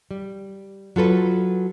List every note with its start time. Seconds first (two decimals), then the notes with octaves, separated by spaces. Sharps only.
0.11 G3
0.96 F#3 F4 A4 B4